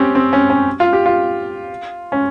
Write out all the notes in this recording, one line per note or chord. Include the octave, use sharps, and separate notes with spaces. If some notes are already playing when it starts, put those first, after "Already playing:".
Already playing: C4 C#4 G4
C4
C#4
C#4
F4
G4
F4
C#4